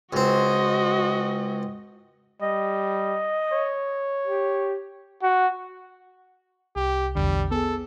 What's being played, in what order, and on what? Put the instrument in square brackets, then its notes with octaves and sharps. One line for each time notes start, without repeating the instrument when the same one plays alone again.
[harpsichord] C#2 C4 [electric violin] F#4 D#5
[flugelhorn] G3 [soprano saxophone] D#5
[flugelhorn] C#5
[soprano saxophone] G4
[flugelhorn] F#4
[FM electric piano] C2 [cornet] G4
[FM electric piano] A#1 E2 D3 [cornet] G3
[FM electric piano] B3 G#4 [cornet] A4